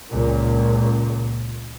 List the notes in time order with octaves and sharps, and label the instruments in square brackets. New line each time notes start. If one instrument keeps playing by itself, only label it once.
[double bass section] C#2 A#2